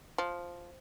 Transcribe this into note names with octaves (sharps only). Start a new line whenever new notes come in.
F3